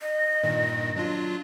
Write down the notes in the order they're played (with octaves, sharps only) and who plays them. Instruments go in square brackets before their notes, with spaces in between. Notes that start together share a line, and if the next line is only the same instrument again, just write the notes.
[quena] D#5
[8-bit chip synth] G2 A#2 D#3
F#3 D4 F4